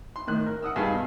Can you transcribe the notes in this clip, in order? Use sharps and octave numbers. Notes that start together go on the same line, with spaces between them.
C6
A2 D#3 F#6
A#4
F#5 D#6 E6
G2 D#4 G#4 F5 G#5 A5
B2